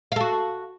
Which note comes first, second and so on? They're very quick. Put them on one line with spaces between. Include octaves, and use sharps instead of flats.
F5 A4 F#4